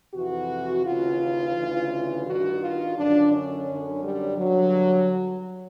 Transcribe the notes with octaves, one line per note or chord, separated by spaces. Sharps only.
F2 C3 E3 F#4
D#2 C#3 E3 F4
D2 C#3 E3
G2 D#3 F#4
F4
F#2 D3 D4
C#4
F#2 D3
G3
G2 D3 F#3